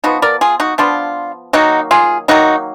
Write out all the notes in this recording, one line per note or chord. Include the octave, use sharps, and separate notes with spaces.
F3 B3 D#4 F#4
A#4 D5
F4 G#4
D#4 F#4
F3 B3 D4 F4
D#3 F#3 A#3 D#4 F#4
F4 G#4
D#3 F#3 A#3 D#4 F#4